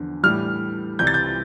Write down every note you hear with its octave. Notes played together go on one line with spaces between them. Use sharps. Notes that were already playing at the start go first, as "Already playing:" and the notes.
Already playing: E2 D3 F3
A2 E3 G3 F6
C2 C3 E3 G3 G6
A6
G6